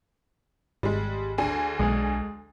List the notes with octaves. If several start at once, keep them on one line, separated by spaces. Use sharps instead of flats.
G#1 G3 G#3
D2 D4 G#4
B1 G#3